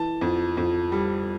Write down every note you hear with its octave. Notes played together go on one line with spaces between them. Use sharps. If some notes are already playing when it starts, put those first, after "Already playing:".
Already playing: E3 A5
F2
F2
G3